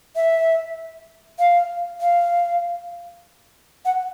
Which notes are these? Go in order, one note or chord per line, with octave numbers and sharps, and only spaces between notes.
E5
F5
F5
F#5